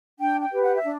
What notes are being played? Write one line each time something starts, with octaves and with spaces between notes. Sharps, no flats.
D4 G5
G5
G4 B4
F#5
E5
D4